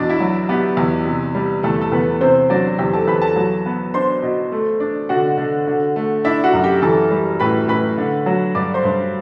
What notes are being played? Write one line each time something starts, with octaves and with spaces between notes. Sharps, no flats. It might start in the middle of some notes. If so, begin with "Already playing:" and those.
Already playing: E2 B2 D4 D5
E4 E5
F#3
B3 G4
E2
C3
G3
E2 A3 A4
A4
E2 B3 B4
C3 C4 C5
F#3 D4 D5
E2 G4 G5
A4 A5
E2 B4 B5
A4 A5
F#3
B3
D4 C5 C6
B2
A3
D4
D3 F#4 F#5
D3
D3
A3
D4 E4 E5
F#4 F#5
F#2
G4 G5
E3 A4 A5
G3
A2 B4 B5
A2 B4 B5
D3
F#3
G2 D5 D6
C5 C6
G2